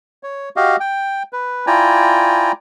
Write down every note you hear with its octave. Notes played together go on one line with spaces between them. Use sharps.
C#5
F#4 G4 D#5 F5
G5
B4
E4 F4 D5 G5 G#5 A#5